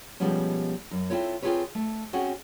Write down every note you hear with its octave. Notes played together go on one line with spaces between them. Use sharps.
B2 F3 G3 G#3 B3 C#4
F#2
C4 E4 F4 A4 C#5
C4 F4 G#4 A4 B4 C#5
A3
C4 C#4 F#4 G#4